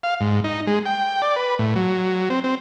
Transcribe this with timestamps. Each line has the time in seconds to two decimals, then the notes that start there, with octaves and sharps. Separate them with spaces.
0.03 F5
0.21 G#2
0.44 D#4
0.67 G#3
0.86 G5
1.22 D5
1.36 B4
1.59 A2
1.76 F#3
2.30 C4
2.44 C4